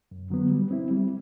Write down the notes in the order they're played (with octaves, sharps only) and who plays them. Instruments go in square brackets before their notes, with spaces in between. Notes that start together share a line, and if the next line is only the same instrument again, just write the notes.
[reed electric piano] F#2
D3 F#3 B3
G3
C4 E4
G3